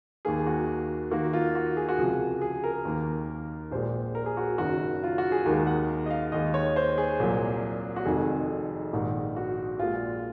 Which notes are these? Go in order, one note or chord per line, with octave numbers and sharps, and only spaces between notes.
D#2 D#3 A#3 G#4
F#4
D#2 D#3 A#3 F#4
F4
F#4
G#4
F#4
C#2 C3 F3 G#3 G#4
G#4
A#4
D#2 D#3 A#3
A#1 A#2 G#3 C5
A#4
G#4
F#4
F#1 F#2 D#3 F#4
F4
F#4
G#4
D#2 D#3 G#3 A#4
F#5
D#5
F5
D#2 D#3 G#3 D#5
C#5
C5
G#4
C2 A#2 F#3 A#3
F#4
F1 F2 D#3 G#3 G#4
A#1 G#2 D#3
F#4
A#1 A#2 G#3 F4